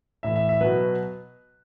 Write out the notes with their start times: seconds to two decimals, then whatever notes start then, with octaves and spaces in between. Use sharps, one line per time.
0.23 A2 E3 E5
0.36 E5
0.49 E5
0.61 B2 F#3 B4